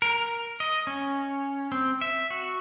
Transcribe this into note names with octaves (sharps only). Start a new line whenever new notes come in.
A#4
D#5
C#4
C4
E5
F#4